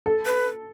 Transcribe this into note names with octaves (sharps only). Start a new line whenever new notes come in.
A4
B4